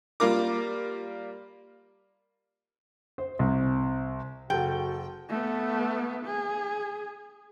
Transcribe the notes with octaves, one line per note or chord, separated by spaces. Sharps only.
G3 A#3 F4 A#4 D6
C5
C2
F#1 F#4 A4 G5
A3 B3
G#4